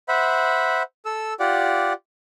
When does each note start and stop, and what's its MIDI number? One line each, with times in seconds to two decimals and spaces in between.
0.09 0.83 72
0.09 0.83 76
0.09 0.83 78
0.09 0.83 83
1.05 1.34 69
1.05 1.34 88
1.40 1.93 65
1.40 1.93 67
1.40 1.93 74
1.40 1.93 78